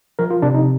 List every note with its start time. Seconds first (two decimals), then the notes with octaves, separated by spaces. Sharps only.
0.19 F3 A#4
0.30 F4
0.42 C3 D4
0.55 D#4